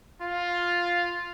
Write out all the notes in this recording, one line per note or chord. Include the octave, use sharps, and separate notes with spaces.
F4